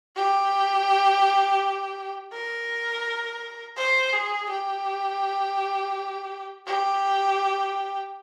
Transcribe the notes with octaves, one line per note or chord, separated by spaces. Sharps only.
G4
A#4
C5
G#4
G4
G4